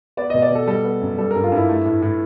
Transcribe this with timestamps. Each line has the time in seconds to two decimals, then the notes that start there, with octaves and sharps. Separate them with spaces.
0.17 B3 D5
0.30 B2 D#5
0.42 D5
0.50 B2
0.55 A4
0.67 G3 A4
0.84 B3
1.01 F#2
1.18 G3 A4
1.31 A#4
1.35 G2
1.44 F4
1.52 G2 E4
1.69 A3
1.85 A2
2.02 A2